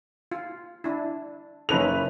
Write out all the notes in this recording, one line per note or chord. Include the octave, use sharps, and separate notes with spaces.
F4
D4 E4
F#1 C#4 D#4 A4 B4 F7